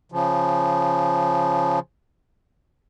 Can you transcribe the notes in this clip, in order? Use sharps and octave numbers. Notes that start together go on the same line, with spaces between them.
C#3 F3